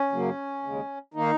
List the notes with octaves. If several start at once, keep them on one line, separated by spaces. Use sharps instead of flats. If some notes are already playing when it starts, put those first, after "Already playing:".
Already playing: C#4
F#2 C#3 F#3 A#3
D#2 C#3 G#3
D#3 A#3 D#4